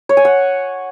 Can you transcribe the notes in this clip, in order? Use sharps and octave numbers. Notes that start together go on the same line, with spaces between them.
C#5
G#5
F#5